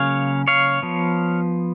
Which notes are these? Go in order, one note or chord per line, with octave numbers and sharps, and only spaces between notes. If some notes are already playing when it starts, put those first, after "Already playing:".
Already playing: C#3 F#3 A#3 C#4 C#5 F5
C#5 F5
F3 B3